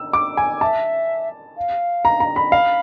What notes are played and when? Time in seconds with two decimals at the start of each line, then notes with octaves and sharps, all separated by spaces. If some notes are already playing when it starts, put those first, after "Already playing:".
Already playing: E6
0.13 D6
0.37 G#5
0.61 E5 A5
1.57 F5
2.05 A#5
2.20 A#5
2.36 B5
2.52 F5 B5